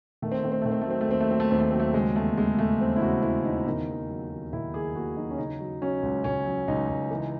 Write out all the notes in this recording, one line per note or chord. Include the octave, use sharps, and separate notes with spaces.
D#3 A3
C4
D#3 A3
C4
D#3 A3
C4
A3
F#3 C4
A3
D#2 C4
A3
F#3 C4
A3
D#2 C4
A3
F#3 C4
A3
C#3 G#3
E2 A3
C#3 G#3
C#3 A3
E2 C4
E4
C#3 F#4
C#3 E4
E2 D#4
D#3 D#4
D#2
F#3
D#2
D#3 E4
D#2 G#4
D#2 F#4
F#3 D#4
C#4
C#3 D#4
F#3
F#3 C#4
C#2
C#2 C#4
F#3
C#2 D#4
C#2
E3